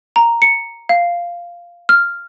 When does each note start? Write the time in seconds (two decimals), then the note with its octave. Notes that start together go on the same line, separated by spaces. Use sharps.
0.16 A#5
0.42 C#7
0.89 F5
1.89 F6